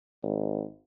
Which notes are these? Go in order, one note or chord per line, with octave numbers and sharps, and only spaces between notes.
G#1